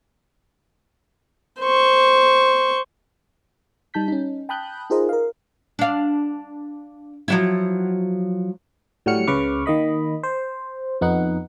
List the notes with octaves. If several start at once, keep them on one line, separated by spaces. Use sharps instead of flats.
C5 C#6
G3 D#4 A5 G6 B6
C#4 D#4
G5 A5 B5 D#6 F#6 G6
D#4 F4 G#4 A#4 C5 D#5
A#4 F5
D4 F5
F3 F#3 E4
A2 F#3 G3 F#4 F6 C#7
C#2 C#3 B4 C#6 D6 F6
D#3 A#3 D#5 B5
C5
F2 B3 D#4 F#5